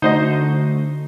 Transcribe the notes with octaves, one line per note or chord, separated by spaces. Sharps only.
D3 A3 D#4 F#4 C5 D#5